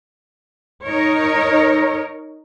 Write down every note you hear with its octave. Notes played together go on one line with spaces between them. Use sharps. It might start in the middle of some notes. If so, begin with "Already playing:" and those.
D#4 A#4 C#5